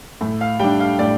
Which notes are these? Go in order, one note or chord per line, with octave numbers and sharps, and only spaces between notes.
A2
F5
G3 D4 G5
F5
A2 D5